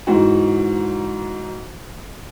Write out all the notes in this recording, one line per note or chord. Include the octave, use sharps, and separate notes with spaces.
G#2 E3 D#4 F#4